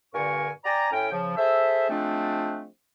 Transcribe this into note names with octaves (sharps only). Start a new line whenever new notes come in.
G2 A#2 D3 A#4 G#5 C#6
D5 G5 G#5 A#5
A2 C#4 G5
C#3 F3
G#4 A4 C5 E5
F3 G#3 A3 C4 D4